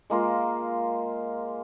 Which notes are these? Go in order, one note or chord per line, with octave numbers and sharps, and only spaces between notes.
G#3 A#3 F4 A#4